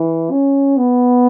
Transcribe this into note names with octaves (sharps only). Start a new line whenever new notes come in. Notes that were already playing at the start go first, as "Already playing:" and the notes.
Already playing: E3
C#4
B3